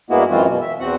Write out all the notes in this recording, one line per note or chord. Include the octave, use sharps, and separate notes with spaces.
G2 G#3 A#3 B3 E4 F#4
F#2 E3 G#3 C4 F4 F#4
B2
E5
E2 C4 F#4 F#5